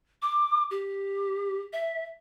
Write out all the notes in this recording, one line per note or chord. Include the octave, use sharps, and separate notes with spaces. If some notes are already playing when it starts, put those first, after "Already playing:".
D6
G4
E5